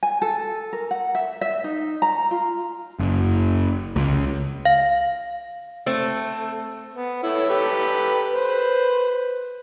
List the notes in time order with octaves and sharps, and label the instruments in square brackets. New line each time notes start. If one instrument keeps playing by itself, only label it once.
[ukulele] G#5
A4
A#4
F#5
E5
E5
D#4
A#5
F4
[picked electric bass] F#1
C#2
[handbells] F5
[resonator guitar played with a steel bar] A3 [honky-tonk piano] C4
[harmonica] B3
E4 A4 C#5
G4 A4 B4
B4 C5